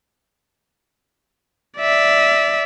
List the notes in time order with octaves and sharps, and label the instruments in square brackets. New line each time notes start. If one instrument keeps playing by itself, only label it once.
[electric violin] D5 E5